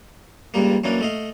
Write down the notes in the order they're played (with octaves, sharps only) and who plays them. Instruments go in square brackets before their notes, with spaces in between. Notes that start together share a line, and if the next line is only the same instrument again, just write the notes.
[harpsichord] C#2 G2 G3 A#3
F#2 E3 A#3 C#4 D4
A3 D#5 F5